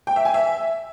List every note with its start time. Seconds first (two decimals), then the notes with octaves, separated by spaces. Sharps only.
0.07 G5
0.16 E5
0.25 G#5
0.34 E5